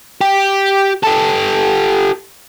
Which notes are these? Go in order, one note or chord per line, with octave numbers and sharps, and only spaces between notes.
G4
G4 A4